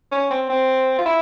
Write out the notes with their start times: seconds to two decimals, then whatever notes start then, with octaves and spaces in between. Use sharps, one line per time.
0.12 C#4
0.30 C4
0.49 C4
0.98 F4
1.06 E4